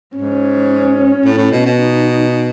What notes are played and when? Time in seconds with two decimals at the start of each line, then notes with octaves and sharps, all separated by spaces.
0.15 G#2 C#4
1.25 A2
1.37 A2
1.52 B2
1.66 B2
1.78 D#4